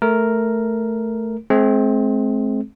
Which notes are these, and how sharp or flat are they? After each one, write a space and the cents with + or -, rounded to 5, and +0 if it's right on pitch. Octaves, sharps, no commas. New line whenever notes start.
A3 +0 A#4 +0
G#3 +45 C4 +10 G#4 +45